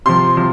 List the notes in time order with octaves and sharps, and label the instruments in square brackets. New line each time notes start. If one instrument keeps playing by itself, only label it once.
[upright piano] C3 F3 C6
C3 F3